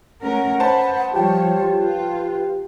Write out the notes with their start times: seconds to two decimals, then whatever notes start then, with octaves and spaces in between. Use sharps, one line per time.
0.21 A3 C#4 A#4 F#5
0.60 B4 C5 A5
1.14 F3 G3 F4 G4 C#5 G5
1.78 F4 B4